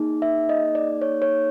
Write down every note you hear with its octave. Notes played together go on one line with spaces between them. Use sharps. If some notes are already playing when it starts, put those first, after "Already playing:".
Already playing: A#3 D#4 G#4
E5
D#5
D5
C#5
C#5